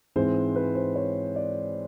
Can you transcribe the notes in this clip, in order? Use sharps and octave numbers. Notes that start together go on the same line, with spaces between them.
G#2 E3 G#3 C4 C5
B4
C5
C#5
D5